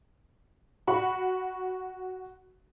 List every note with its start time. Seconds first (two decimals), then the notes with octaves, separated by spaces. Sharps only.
0.87 F#4 B5 C#6